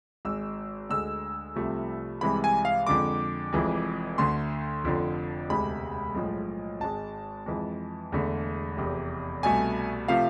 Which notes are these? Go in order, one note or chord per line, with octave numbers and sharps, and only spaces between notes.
G#1 G#2 G#3 E6
D2 D3 G#3 E6
C2 C3 F3 A3
C2 C3 E3 G#3 B5
G#5
F5
F2 D3 G#3 D6
F1 F2 E3 G#3
D2 D3 A3 C6
F1 F2 D3 F3
E1 D2 C3 G#3 B5
B1 A2 F3 G#3
G#1 G#2 G#3 A5
F2 E3 G#3
E1 E2 D3 A3
F1 E2 C3
C2 B2 A3 G#5
C3 F3 A3 F5